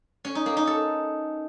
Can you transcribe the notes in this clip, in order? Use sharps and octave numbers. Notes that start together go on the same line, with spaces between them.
C#4
D#4
A#3
D#4
A4